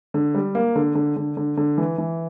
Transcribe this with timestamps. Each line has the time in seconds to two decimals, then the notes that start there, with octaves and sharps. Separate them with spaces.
0.14 D3
0.34 G3
0.55 A#3
0.76 D3
0.95 D3
1.16 D3
1.37 D3
1.57 D3
1.78 E3
1.98 E3